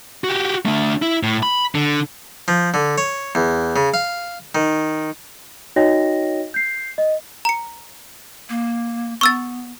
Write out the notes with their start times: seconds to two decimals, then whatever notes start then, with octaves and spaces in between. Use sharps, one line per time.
0.24 F#4 G4
0.65 A3 D4
1.02 E4
1.23 A2
1.43 B5
1.75 D3
2.48 F3
2.74 D3
2.98 C#5
3.35 E2
3.76 C#3
3.94 F5
4.55 D#3
5.76 D#4 F#4 C#5 D#5 G5 A#6
6.54 G6 C7
6.98 D#5
7.45 A#5 C#7
8.49 A#3
9.21 B3 C#6 E6 A6